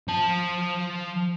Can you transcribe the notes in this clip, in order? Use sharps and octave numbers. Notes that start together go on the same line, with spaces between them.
F3 A5